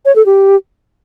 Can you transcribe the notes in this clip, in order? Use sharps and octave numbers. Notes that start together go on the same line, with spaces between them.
C#5
A4
G4